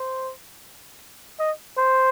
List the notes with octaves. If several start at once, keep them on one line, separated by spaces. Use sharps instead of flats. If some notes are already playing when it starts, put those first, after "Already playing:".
Already playing: C5
D#5
C5